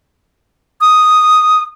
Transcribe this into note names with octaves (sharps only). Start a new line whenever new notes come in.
D#6